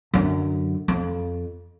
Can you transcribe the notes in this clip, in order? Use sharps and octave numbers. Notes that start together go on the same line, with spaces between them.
F#2 D3
F2